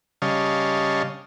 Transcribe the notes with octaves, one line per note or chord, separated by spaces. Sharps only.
C#3 G3 C#5 D#5 F5 A5